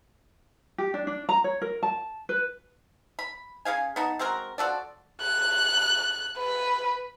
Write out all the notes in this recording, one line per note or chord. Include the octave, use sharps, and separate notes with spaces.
G4
D4
D4
A#5
C#5
A#4
A5
B4
B5
C#3 G#4 F5 G#5
B3 D#4 A5
G#3 C4 F#4 A#4
F3 F#4 A4 D5
F#6
B4